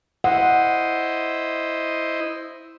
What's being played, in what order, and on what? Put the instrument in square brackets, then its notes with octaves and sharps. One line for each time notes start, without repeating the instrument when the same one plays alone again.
[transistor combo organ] E4 C5 D#5 [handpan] F#5